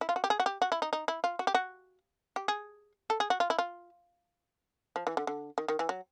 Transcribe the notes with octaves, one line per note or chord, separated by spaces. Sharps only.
E4
F4
F#4
G4
G#4
F#4
G4
F#4
E4
D#4
D#4
E4
F4
F#4
G4
F#4
G4
G#4
A4
G#4
F#4
F4
E4
F4
F3
E3
D3
D3
D#3
D#3
E3
F#3